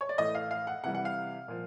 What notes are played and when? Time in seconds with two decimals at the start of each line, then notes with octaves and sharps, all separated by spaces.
0.01 C#5
0.09 D5
0.18 A2 E3 A3 D#5
0.35 F5
0.51 F5
0.67 F#5
0.84 C3 E3 G3 F#5
0.95 F#5
1.05 F5
1.48 A#2 F3